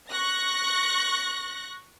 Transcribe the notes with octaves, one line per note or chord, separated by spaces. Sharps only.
C#6 F#6 A#6